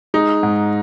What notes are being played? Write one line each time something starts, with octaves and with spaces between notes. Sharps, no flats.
G#3 D#4
G#2